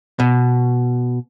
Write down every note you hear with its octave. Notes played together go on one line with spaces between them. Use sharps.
B2